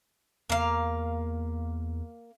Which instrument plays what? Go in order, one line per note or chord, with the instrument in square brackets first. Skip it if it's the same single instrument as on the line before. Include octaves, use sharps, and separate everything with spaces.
[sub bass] E2 [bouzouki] A#3 F5